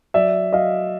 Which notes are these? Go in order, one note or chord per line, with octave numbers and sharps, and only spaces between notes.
F#3 D5 E5
F#3 D#5 F5